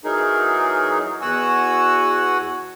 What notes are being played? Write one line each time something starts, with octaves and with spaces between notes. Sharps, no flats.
E3 F#3 D#4 G#4 A#4
E2 F#4 F#5 G#5 E6